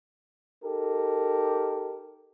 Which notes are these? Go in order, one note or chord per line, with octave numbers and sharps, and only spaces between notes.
D#4 G4 A4 A#4